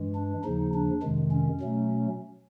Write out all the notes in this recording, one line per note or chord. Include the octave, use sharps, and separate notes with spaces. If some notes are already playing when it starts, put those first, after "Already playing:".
Already playing: G2 E3 G#3
D4
D#2 C#3 F3 D#4
D4
F2 C3 D#3 G#3
C#4
B2 F#3 A3